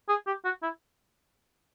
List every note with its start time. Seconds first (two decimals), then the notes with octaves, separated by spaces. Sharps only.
0.09 G#4
0.27 G4
0.44 F#4
0.63 E4